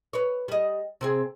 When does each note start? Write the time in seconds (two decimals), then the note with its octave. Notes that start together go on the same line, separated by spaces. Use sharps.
0.13 B4 C#5
0.48 G3 D#5
1.01 C3 C4 G#4